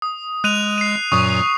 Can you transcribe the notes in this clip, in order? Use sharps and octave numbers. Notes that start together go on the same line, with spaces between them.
D#6
G#3 F#6 D#7 F7
C7 D#7
F#2 A#2 F#3 C#6 D#6